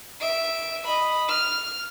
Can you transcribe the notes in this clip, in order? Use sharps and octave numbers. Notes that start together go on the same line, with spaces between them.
E5 D7
D#5 B5
F6